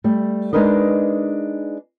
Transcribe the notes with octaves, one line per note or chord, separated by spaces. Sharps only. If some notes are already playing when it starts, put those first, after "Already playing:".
G3 A3
G#3 D4 D#4 A#4 B4 D#5